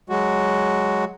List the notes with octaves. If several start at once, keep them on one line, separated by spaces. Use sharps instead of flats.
F#3 G#3 F#4